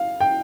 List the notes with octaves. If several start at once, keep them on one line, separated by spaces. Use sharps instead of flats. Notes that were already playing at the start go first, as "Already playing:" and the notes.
Already playing: F5
G5